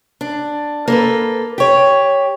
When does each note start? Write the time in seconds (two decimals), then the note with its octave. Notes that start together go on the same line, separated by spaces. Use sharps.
0.21 D4
0.88 A#3 A4 B4
1.58 G4 C#5